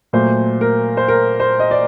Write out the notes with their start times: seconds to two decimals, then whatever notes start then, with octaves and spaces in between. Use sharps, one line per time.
0.13 A#2 F#3 A3 C5
0.61 A#4
0.97 C5
1.08 A#4
1.40 C5
1.59 D#5
1.71 D5